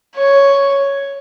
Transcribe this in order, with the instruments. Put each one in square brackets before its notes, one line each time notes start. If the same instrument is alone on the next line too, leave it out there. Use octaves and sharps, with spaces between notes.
[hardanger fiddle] C#5